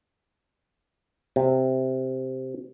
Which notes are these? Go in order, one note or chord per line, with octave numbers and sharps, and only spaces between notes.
C3